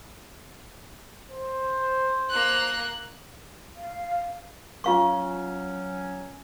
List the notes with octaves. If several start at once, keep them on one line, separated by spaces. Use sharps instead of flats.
C5
A#3 F#6
F5
F#3 C#4 F4 F5 C#6